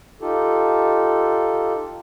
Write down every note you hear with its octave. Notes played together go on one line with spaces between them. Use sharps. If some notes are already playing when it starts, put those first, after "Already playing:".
D#4 F4 G4 A4